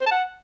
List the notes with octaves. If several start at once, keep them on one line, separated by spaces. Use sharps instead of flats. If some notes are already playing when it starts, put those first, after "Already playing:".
C5
A5
F#5